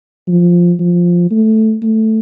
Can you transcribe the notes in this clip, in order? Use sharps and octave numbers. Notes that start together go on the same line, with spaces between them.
F3
F3
A3
A3